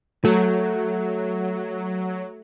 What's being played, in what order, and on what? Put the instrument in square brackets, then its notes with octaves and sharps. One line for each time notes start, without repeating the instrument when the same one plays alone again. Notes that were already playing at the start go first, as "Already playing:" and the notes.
[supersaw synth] F#3 [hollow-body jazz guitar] A3